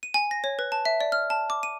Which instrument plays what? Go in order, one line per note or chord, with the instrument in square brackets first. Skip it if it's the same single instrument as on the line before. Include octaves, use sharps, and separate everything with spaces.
[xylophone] D#7
G#5
A#6
C#5
B4
A5
E5
D5
F6
A5
D6
D#7